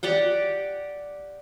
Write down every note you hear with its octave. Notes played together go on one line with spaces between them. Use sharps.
G4 D5 F#5 G5